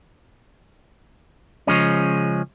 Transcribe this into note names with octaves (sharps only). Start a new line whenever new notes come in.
C#3 F3 G#3 C#4